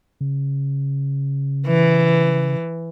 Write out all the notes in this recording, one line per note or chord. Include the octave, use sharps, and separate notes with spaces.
C#3
E3